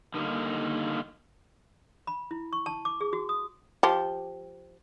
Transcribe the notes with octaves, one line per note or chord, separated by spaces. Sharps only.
D3 D#3 G3 A#3
B5
E4
C#6
A5
D6
G#4
F#4
D#6
F3 G4